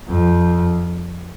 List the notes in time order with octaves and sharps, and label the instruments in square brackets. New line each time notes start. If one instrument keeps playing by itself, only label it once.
[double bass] F2